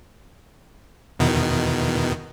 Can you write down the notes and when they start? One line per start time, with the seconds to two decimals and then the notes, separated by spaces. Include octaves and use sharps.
1.19 E2 B2 D#3